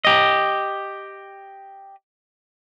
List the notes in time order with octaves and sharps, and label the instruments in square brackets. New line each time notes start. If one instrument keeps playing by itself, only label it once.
[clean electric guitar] G4 D#5